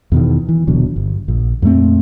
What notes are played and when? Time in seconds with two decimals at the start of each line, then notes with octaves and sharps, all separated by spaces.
0.12 E2 B2 D#3
0.49 E3
0.67 D#1 B2 D3 F#3
0.96 G1
1.28 A#1
1.62 F2 A#2 A3 C4